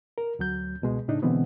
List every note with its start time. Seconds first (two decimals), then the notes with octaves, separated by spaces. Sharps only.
0.18 A#4
0.39 D2 F#3 G6
0.82 C#2 B2 G#3
1.08 A2 C#3 D4 D#4
1.22 B2 D3 E3 G#3 B3 C4